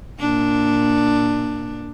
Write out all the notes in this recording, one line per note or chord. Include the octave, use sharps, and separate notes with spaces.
A#2 D4